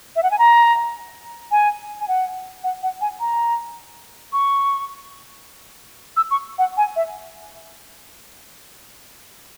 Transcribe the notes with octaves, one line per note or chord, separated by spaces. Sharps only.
E5
F#5
G#5
A#5
G#5
G#5
F#5
F#5
F#5
G#5
A#5
C#6
E6
C#6
F#5
G#5
E5